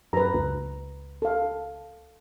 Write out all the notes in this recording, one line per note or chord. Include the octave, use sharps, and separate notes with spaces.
F#2 B4 A#5
C#2
A4 F5